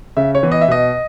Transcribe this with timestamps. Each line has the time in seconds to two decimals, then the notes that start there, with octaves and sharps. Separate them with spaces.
0.17 C#3 E5
0.35 C#5
0.43 E3 B3
0.52 D#5
0.61 E5
0.68 B2 D#5